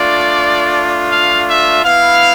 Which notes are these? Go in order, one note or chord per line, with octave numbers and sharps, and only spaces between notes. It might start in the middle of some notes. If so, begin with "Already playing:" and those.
Already playing: A3 D4 F4 D5
F5
E5
B3 E4 F5